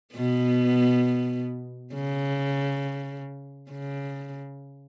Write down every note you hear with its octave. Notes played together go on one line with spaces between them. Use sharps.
B2 B3
C#3
C#3